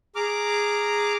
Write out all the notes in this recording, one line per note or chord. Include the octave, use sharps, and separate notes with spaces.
G#4 A#5 D6 F6